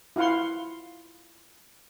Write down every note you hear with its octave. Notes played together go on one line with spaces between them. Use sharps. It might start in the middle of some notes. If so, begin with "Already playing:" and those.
E4 F4 F5 F#5 C6